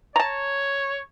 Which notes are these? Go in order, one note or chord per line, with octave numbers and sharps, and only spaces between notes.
C#5 A5 A#5